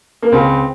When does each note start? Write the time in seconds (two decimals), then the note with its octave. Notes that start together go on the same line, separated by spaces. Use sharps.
0.22 A#3
0.32 C#2 C4